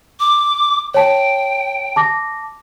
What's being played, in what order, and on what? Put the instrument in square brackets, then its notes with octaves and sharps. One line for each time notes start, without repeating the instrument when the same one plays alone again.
[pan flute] D6
[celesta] C#5 A5 [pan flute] G5
[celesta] A5 D6 A#6